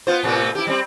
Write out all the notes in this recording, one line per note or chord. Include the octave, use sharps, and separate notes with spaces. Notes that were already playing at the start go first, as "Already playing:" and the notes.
B3 F4 C5
A2 C3 B3
E4 G4
G3 C4